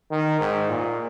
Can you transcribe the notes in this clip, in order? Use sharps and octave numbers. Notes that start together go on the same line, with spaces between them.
D#3
G#2
A#2